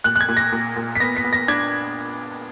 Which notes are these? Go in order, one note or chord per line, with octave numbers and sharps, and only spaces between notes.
A#2 F#6
F#6
G#6
A#2
A#6
A#2
A#2
B6
B3 A#6
B6
B3
A#6
D4 G#6